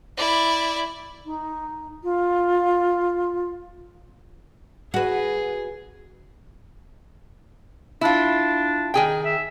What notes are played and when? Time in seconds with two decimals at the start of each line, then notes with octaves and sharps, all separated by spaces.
0.17 E4 D5
1.25 D#4
2.03 F4
4.94 F#4 G#4 B4
8.01 D4 E4 F4
8.94 D#3 G#4 G5
9.25 E5